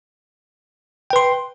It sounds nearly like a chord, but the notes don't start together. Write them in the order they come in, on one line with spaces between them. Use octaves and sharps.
G5 B4 C6